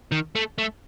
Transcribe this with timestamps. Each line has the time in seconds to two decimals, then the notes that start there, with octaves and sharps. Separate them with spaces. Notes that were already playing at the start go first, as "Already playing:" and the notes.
0.12 D#3
0.35 A3
0.58 A3